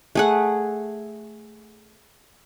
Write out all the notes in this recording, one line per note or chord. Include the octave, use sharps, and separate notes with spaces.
A3 G#4 F#5